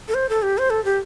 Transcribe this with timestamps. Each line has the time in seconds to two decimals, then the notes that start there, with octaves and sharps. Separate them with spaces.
0.08 A4
0.14 C5
0.29 A4
0.42 G4
0.58 C5
0.70 A4
0.85 G4